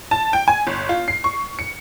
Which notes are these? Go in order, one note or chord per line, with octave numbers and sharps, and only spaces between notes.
A5
G5
G#5
G1
F4
C7
C#6
C#7